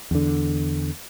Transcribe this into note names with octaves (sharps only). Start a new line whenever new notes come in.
E2 D3